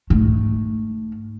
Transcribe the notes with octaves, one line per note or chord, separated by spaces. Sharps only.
G#2 A3